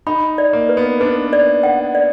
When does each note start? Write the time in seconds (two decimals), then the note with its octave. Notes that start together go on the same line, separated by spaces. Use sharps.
0.07 D#4 B5
0.38 D5
0.53 A#3
0.69 B4
0.77 B3
1.00 D4 B4
1.33 D5
1.63 F#5
1.95 D5